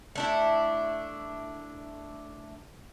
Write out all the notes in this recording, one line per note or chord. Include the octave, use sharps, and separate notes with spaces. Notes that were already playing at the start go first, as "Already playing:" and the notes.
A3 D4 E4